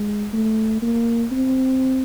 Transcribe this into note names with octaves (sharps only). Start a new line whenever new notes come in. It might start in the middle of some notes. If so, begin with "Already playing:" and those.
Already playing: G#3
A3
A#3
C4